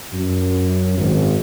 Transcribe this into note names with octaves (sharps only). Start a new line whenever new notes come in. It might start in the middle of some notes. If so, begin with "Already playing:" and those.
F#2
G#1